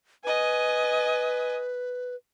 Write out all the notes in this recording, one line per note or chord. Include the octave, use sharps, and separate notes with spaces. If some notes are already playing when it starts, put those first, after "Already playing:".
B4 D#5 G#5